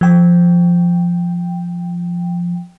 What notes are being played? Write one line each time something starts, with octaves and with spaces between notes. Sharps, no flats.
F3 G5